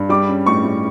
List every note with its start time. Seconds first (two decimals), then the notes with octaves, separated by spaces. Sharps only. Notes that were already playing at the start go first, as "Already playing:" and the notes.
Already playing: G2
0.09 G3 D6
0.29 C#4
0.46 A2 C#6
0.64 A2